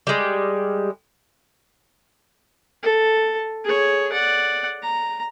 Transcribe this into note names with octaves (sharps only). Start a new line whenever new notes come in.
G3 G#3
A4
G#4 C#5
D5 F#5
A#5